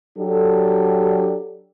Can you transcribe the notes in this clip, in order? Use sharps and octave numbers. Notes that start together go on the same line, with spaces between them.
F#3 D4 G4 A4